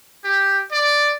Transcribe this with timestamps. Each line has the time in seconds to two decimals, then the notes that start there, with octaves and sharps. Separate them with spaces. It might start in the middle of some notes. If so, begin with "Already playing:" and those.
0.24 G4
0.71 D5